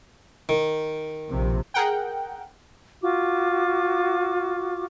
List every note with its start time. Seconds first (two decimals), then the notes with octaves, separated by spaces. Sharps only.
0.49 D#3
1.29 A#1 C3
1.74 G#4 A#4 F#5 G5
3.02 F4 F#4 D6